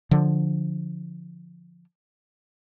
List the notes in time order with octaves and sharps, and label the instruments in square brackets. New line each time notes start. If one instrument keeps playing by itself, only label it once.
[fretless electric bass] D3 F3